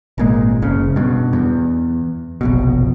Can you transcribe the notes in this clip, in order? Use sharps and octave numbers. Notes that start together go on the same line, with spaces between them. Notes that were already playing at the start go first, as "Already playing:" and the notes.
G#1 A#2 G#3
F#1 C#3
G2 B2
E2
F1 A#1 B2